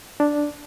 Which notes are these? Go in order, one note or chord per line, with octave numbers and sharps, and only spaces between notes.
D4